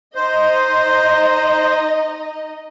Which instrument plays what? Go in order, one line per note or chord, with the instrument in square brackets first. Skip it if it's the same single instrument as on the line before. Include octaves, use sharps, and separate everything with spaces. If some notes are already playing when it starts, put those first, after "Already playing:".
[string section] D#4 D#5 [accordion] C5